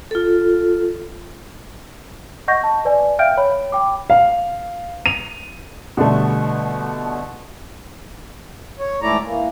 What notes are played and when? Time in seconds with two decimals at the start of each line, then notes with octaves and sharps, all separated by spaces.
0.11 F4 A4
2.48 D#5 F#5 C#6 G6 A#6
2.63 A5
2.85 B4 D5 G#5
3.19 E5 F5 G5 F6 G6 D7
3.37 C#5 B5
3.72 G5 D6
4.10 F5
5.06 D#7 F7
5.97 B2 D3 G3 A3
8.79 C#5
9.02 G#2 E3 A3 E4 D5 A#5
9.24 E3 A#3